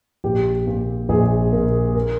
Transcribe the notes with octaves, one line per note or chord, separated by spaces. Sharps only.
A#1 G4
A#2
A#1 G#4
A#2 A#4
A#4